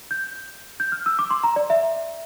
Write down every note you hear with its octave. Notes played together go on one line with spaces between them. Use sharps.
G6
G6
F6
E6
D6
C6
A#5
D5
E5